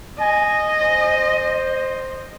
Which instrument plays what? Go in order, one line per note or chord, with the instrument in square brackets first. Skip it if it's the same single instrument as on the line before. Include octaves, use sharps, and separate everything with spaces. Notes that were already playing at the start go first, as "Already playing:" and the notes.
[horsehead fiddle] D#5 [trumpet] G#5
[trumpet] C5